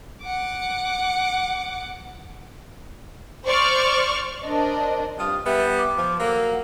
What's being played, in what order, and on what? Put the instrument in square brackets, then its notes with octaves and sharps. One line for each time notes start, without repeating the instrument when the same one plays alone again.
[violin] F#5 D6
[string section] C5 D5 C#6 F6
[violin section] D4 A#4 C5 D#5
[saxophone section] G2 C3 F4 [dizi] D#6
[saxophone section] G3 B3 [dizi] E5
[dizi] D6
[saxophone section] F3
[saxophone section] F#3 A#3 [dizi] A4
[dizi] F#5